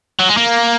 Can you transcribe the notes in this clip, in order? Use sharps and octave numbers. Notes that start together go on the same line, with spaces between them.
F#3
G#3
A#3